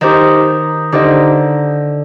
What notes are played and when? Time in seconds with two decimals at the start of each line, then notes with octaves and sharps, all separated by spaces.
0.01 D#3 D#4 G4 C5 D#5
0.92 D3 D#4 G4 C5 D#5